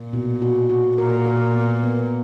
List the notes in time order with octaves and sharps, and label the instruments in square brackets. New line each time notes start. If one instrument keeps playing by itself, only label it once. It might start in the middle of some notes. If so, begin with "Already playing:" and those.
Already playing: [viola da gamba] A#2
[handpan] B2
F#4
F#4
[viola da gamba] A#2 [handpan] A#4
[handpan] A#4
B3
B3